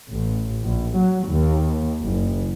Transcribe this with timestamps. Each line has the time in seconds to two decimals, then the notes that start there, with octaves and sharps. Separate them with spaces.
0.12 A1
0.63 A#1
0.96 F#3
1.30 D#2
2.02 F#1